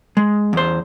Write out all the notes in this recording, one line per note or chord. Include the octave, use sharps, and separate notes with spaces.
G#3
E2 C5